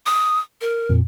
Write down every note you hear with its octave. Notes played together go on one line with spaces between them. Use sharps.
D#6
A#4
F2 A#2